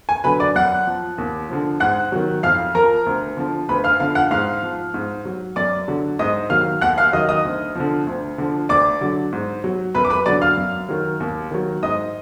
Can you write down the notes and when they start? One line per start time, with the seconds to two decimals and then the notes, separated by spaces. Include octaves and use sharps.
0.09 G#5
0.24 D3 F#3 B4 B5
0.40 D5 D6
0.55 F#2 F#5 F#6
0.87 F3
1.18 D#2
1.50 D3 F3
1.80 G#2 F#5 F#6
2.12 D#3 F#3
2.43 F2 F5 F6
2.75 F3 A#4 A#5
3.06 D2
3.37 D3 F3
3.69 D2 B4 B5
3.84 F5 F6
4.00 D3 F3 F5 F6
4.15 F#5 F#6
4.31 G#2 F5 F6
4.63 F3
4.94 G#2
5.25 F#3
5.56 F#2 D5 D6
5.88 D3 F#3
6.19 G#2 D#5 D#6
6.50 D#3 F#3 F5 F6
6.81 D#2 F#5 F#6
6.98 F5 F6
7.13 D#3 F#3 D#5 D#6
7.29 D#5 D#6
7.45 D2
7.75 D3 F3
8.07 D2
8.38 D3 F3
8.69 D2 D5 D6
9.01 D3 F#3
9.32 G#2
9.64 F#3
9.95 F#2 B4 B5
10.05 D6
10.10 B4 B5
10.26 D3 F#3 D5 D6
10.42 F5 F6
10.57 F#2
10.89 D#3 F#3
11.20 D#2
11.51 D#3 F#3
11.83 G#2 D#5 D#6